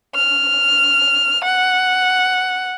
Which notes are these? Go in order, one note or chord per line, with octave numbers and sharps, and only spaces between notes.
F6
F#5